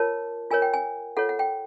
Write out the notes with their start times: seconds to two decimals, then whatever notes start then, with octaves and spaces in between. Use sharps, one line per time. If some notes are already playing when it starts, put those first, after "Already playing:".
Already playing: F4 A#4 C#5 A5
0.51 F4 A#4 C#5 G#5
0.62 G5
0.74 G#5
1.17 F4 A4 C#5 F#5
1.29 F#5
1.39 G5